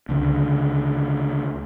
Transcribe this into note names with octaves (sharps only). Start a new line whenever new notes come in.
C#2 D3